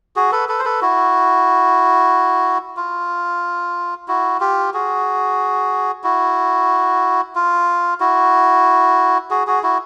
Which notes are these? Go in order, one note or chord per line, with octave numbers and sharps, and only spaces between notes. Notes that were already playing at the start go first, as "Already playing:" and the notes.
F#4 G#4
A4 B4
A4 B4
C5
A4 B4
E4 F#4
F4
E4 F#4
F4 G4
F#4 G#4
E4 F#4
F4
E4 F#4
F#4 G#4
F#4 G#4
E4 F#4